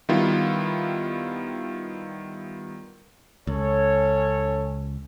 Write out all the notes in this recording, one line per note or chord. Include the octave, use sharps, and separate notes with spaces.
D#3 G3 B3 E4 F4
C#2 C#4 A4 C#5